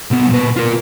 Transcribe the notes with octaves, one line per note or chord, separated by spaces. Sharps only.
C2 B3
A#2 B4
F4 A#4